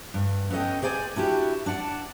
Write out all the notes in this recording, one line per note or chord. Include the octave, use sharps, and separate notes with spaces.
G2
B3 C#4 A4 D#5 G5
G#4 C5 D5 G5 G#5
D4 E4 F#4 G4
D4 D5 F#5 A5